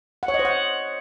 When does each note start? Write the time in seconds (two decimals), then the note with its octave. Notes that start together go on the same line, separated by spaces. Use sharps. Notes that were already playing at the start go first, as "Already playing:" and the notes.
0.23 F#5
0.28 C#5
0.34 D#5
0.39 C5
0.45 F#5